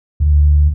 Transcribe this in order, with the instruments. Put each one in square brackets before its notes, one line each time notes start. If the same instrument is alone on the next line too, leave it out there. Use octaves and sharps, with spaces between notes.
[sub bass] D2